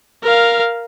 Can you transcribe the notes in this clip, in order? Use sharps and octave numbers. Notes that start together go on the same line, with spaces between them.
A#4 F5